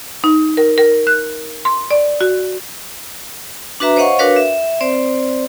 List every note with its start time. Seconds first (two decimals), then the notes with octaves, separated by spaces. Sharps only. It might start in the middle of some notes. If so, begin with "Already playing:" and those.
0.24 D#4
0.57 A#4
0.78 A#4
1.07 F#6
1.65 C6
1.91 D5
2.21 F#4
3.80 D4 F#4 B4 E5 A#5
3.96 C5 C#5 D#5 F5 F#5 C#6
4.19 D4 F#4 A#4 B4 C#5 F5
4.36 E5
4.81 C4 C5 D5